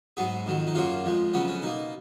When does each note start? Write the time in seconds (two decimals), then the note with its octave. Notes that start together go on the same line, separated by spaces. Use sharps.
0.17 G#2 F#3 B3 G#4
0.46 F2 D#3 F#3
0.67 D#4
0.75 F#2 C#3 F#3 A#3 F4
1.05 F2 F3 G#3
1.34 F2 C#3 F#3 B3 C#4
1.48 C#4
1.62 B2 A#3 D#4